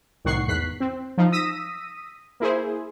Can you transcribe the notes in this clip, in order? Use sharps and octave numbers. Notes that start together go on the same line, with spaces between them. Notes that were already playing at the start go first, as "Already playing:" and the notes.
C2 A2 D#3 F#5 C#6 C7
G#1 E2 F#6 B6 C7
C4
F3 D#4
D#6 E6 A#6 B6 D#7
A#3 E4 G#4 C5